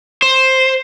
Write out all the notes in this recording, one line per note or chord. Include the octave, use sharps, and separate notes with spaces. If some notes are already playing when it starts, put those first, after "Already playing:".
C5